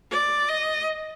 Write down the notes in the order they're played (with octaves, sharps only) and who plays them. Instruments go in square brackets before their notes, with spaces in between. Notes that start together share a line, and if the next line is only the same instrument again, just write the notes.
[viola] D5
D#5